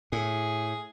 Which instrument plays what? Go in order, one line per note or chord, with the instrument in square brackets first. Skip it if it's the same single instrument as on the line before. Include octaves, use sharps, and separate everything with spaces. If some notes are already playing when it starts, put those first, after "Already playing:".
[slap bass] A2 [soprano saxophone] G#4